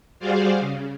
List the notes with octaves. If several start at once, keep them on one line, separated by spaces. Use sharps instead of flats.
G3 F#4 G#4 C5 D5 F5
C#3